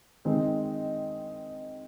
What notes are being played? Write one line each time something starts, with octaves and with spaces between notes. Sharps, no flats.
D#3 G#3 C4 D#4